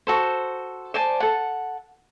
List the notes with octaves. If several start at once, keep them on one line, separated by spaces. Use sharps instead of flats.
F#4 A4 C5
C5 D5 G#5 A5
A4 F#5